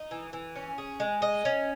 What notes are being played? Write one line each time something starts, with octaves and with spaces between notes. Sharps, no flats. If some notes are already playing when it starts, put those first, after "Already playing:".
Already playing: D#4
E3
E3
C#4
G#4
G#3
D#5
C#4